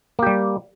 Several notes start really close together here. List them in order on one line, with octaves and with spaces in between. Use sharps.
A#3 G4 G3